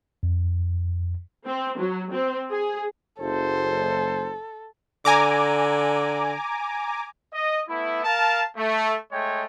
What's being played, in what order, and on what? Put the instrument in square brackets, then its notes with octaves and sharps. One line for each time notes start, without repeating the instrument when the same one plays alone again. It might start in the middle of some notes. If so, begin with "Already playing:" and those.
[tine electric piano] F2
[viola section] C4
F#3
C4
G#4
[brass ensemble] F#1 C5 [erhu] A4
[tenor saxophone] D3 [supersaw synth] G#5 A#5 D6
[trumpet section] D#5
A3 B3 E4
A#4 F5 A5
A3
G#3 A3 C#5 G5